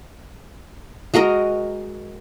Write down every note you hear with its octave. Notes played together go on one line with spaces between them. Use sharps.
G#3 F#4 A#4 D#5